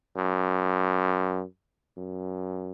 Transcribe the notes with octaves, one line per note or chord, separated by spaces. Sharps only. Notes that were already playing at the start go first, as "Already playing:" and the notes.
F#2
F#2